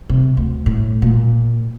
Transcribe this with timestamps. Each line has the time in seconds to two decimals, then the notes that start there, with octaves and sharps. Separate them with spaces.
0.09 C3
0.37 D2
0.66 A2
1.02 A#2